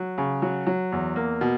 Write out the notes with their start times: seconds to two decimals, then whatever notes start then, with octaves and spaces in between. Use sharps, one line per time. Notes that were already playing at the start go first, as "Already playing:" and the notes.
Already playing: F#3
0.18 C#3
0.42 F#3
0.66 F#3
0.92 E2
1.16 A#3
1.41 B2